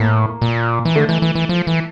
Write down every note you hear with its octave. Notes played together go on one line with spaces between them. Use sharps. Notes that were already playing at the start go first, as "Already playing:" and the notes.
Already playing: A2 A#3
A#2
E3
D3 A3
E3
E3
E3
F3
E3